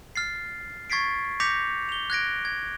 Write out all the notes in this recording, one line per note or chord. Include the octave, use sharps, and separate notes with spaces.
F6 A6 C7
C#6 G#6 A6 B6 C7 D7
D6 G6 A#6 B6 C#7 F7
F7 G7
F#6 G#6 A#6 D7
G#6